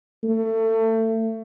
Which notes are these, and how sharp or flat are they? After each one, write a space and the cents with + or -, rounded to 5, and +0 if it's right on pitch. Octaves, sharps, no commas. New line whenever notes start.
A3 +25